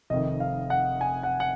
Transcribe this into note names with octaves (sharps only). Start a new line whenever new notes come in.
F1 F2 D#3 D#5
F5
F#5
G#5
F#5
F#5